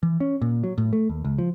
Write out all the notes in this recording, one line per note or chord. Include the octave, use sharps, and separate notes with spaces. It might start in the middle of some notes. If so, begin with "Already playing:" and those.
E3
C#4
A#2
F#3
A2
A3
D#2
C#2
F3